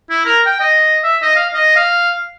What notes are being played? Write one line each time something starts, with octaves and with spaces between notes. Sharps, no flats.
E4
A#4
G5
D#5
E5
D#5
F5
D#5
F5